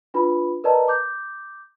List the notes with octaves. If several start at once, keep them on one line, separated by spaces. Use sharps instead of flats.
D4 F4 B4 B5
A#4 B4 D5 D#5 A5 A#5
D6 G6